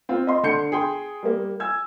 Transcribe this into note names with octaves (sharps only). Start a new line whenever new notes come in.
C4 F4
D#5 C6
D3 C6 G6 C#7
G#4 G5 C6
G3 A#3
G#5 E6 G#6